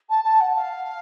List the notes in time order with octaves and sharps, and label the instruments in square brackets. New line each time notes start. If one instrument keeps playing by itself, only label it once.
[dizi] A5
A5
F#5
F5